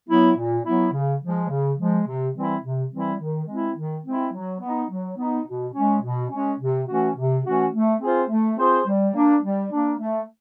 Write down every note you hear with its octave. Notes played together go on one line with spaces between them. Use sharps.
F#3 B3 E4
A#2
F#3 B3 E4
C#3
F3 G#3
C#3
F3 G#3
C3
E3 G3 C4 E4
C3
E3 G3 C4 E4
D#3
G#3 C4 E4
D#3
G#3 C4 E4
F#3
B3 D#4
F#3
B3 D#4
B2
G#3 C#4
B2
G#3 C#4
C3
E3 A3 C#4 F#4
C3
E3 A3 C#4 F#4
A3
C4 F4 G#4 C5
A3
C4 F4 G#4 C5
G3
A#3 D4
G3
A#3 D4
A3